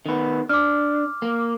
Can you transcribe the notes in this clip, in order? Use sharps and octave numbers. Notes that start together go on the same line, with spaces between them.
D#3 B3
D4 D6 F6
A#3